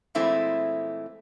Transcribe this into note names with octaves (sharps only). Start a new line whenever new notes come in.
A#2 E3 G#3 A3 C4 E4